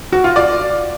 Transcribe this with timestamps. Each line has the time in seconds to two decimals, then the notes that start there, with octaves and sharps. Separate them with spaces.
0.13 F#4
0.24 F4
0.36 D5